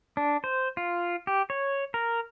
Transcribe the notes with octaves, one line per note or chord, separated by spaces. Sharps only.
D4
C5
F4
G4
C#5
A#4